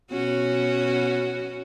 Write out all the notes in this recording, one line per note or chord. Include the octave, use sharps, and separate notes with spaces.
B2 C#4 F#4